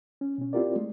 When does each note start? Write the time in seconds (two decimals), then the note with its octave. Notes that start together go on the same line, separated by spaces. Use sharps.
0.21 C#4
0.38 B2 C#4
0.53 C4 E4 F4 G4 A#4 D5
0.76 G#3 A3